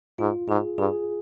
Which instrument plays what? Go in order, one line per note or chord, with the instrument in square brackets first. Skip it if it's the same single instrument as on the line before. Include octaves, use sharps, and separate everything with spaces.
[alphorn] G#2 [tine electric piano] F4
[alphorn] G#2 [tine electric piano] G#4
[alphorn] G2 [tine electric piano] G#4